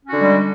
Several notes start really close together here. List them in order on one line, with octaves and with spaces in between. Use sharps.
C#4 F#4 D3 G#3 G3